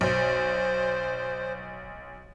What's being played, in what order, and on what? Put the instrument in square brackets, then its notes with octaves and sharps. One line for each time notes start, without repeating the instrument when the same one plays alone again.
[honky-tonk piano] B1 [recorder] C5